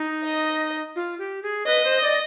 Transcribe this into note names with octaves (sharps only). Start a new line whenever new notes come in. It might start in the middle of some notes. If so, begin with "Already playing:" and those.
Already playing: D#4
D#5
F4
G4
G#4
B4 D#5
C5
D5